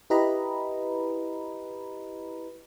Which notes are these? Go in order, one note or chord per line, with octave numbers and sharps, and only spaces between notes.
E4 G4 B4 D#5 A#5 B5